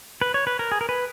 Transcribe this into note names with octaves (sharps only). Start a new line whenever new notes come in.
B4
C#5
B4
A#4
G#4
A#4
B4